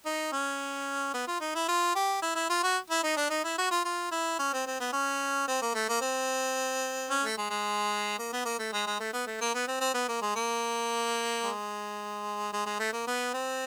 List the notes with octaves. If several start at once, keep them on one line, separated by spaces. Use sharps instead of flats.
D#4
C#4
B3
F4
D#4
E4
F4
G4
E4
E4
F4
F#4
E4
D#4
D4
D#4
E4
F#4
F4
F4
E4
C#4
C4
C4
B3
C#4
C4
A#3
A3
A#3
C4
C#4
A3
G#3
G#3
A#3
B3
A#3
A3
G#3
G#3
A3
B3
A3
A#3
B3
C4
C4
B3
A#3
G#3
A#3
G#3
G#3
G#3
A3
A#3
B3
C4